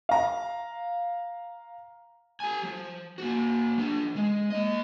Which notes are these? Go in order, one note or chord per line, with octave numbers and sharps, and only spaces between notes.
F5 A#5
G4 G#5
F3
A#3 F#4
F3 D4
G#3
A#3 D#5